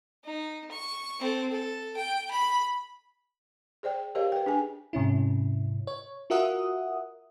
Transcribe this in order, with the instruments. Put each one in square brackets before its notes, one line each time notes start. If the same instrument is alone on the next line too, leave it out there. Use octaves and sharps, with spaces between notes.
[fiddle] D#4
C#6
C4 A4
A4
G5
B5
[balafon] G#4 C5 D5 G5
G4 A#4 C5 C#5 D#5 F5
B4 G5
D4 G#4 G#5
[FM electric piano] G#2 C3 C#4 E4
C#5
F4 F#4 A#4 E5 F#5 D#6